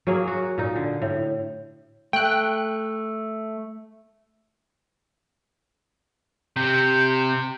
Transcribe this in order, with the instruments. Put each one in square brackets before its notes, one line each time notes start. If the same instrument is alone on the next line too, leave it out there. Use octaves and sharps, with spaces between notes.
[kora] F#3 A#3 G#4
F#4
A#2 D#4
D3
A2
[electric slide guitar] A3 [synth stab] G5 F#6
[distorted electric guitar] C3 [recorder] G6